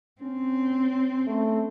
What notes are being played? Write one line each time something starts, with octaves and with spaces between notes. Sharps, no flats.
C4 C#4
A3